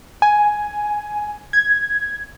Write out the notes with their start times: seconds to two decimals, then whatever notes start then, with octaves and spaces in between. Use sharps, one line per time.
0.22 G#5
1.53 G#6